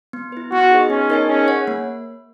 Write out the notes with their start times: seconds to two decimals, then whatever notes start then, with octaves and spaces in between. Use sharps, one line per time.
0.13 B3
0.32 E4 B4
0.52 B3 F#4
0.71 D#4 G#4 B4 D#5
0.90 B3 C#4
1.10 D#4 A#4 D#5 G#5
1.29 C#4 G#4
1.48 C#5 F#5
1.68 A#3